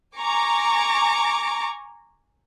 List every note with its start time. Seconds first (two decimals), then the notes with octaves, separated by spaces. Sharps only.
0.17 G#5 A#5 C#6 D6